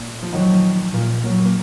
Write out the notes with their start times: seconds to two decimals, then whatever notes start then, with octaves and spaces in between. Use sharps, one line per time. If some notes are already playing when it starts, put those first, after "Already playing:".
Already playing: A#2
0.23 F3
0.33 D#3 F#3
0.94 A#2 A#3
1.24 F#3 A#3
1.46 A#3